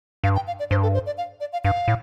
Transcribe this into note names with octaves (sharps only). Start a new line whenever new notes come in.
G2 F5
G5
F5
D5
G2 C5
A4
C5
D5
F5
D5
F5
G2 F5
A2